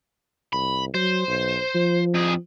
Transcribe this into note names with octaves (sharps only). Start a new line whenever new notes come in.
C2 B5
F#3 C5
B1
F3
F2 G#4